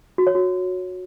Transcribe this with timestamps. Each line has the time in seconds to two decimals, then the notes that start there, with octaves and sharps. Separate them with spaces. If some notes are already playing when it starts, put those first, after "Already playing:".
0.18 F#4
0.27 C#5
0.35 F#4